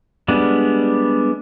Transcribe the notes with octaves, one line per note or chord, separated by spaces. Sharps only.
G3 G#3 B3 D4